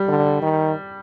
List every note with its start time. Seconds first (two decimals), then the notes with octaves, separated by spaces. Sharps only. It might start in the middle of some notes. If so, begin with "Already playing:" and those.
Already playing: G3
0.09 D3
0.42 D#3